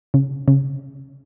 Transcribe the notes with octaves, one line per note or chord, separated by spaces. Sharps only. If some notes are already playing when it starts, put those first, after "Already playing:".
C#3
C#3